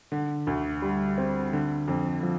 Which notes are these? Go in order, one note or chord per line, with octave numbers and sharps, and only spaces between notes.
D3
D2
G3
C4
D3
F2
F3